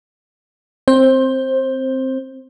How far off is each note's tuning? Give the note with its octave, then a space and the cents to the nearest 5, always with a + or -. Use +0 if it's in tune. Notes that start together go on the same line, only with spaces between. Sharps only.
C4 +0 C5 +20